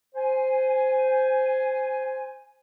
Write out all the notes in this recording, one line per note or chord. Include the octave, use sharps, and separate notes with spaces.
C5 G#5